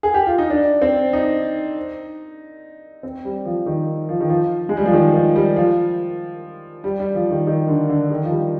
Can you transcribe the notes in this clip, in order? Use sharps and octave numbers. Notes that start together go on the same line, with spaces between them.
G#4
G4
F4
D#4
D4
C4
D#4
C4
G3
F3
D#3
F3
D#3
F3
G#3
G3
F3
D#3
F3
G3
F3
G3
G3
F3
D#3
D#3
D3
D3
D#3
F3
G3